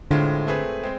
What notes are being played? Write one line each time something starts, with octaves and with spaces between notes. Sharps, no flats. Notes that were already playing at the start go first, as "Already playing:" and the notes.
A2 D3 G#3 C4 F4
A3 C4 G#4 B4
G#3 C4